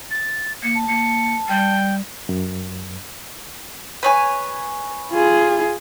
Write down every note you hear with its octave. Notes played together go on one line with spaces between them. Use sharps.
A6
A#3 C#7
A5
A#3 C#7
G3 G5
F#2
B4 C#5 G#5
F4 G#4